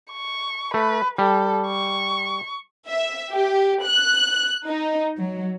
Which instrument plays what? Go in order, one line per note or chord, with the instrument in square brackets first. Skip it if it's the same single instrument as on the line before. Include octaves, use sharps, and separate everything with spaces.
[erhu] C#6
[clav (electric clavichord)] A3 [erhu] B4
[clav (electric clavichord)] G3 [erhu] A4
[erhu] C#6
[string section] E5
G4
F#6
D#4
F#3